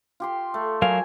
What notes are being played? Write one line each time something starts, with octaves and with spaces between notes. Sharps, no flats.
F4 G4 C6
A3
F#3 A#4 F5 G#5